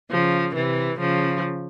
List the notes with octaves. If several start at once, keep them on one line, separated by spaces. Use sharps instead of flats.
C#3 F3
C3 E3
C#3 F3